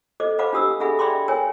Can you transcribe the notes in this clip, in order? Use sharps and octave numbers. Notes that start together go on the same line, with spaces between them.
A4 C5 D#5 D6
B4 C5 F5 F#5 B5 D6
D4 G4 D#6 E6
D4 G#4 A4 E5 F#5 B5
D5 E5 G5 B5 C6 D6
A#4 C#5 G5 G#5